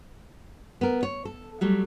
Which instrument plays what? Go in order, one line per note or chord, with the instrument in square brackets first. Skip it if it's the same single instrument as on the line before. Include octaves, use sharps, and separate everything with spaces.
[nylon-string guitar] B3 A#4
C#5
A4
F#3 G3 A3